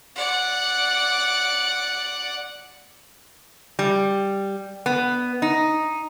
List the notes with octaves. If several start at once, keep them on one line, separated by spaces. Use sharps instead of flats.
D5 F#5
G3
B3
D#4